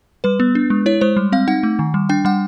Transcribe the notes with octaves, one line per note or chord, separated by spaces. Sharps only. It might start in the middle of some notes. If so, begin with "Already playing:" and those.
G3 B4
B3
D4
G#3
E4 C#5
G#3 C5
G3
C4 F5
D#4 F#5
A3
D#3
G3
D4 G5
G3 F#5